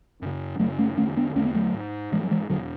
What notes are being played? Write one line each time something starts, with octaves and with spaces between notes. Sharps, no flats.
F#2 C#3
F#2 C#3 F#3 A3
A3 C#4
E2 D3 A3 C#4
B3 D4
E2 D3 A3 C#4
B3
F#3 A3
G#2
G#2 E3 G#3
F#3
E3 G#3
E2 B2 D3 F#3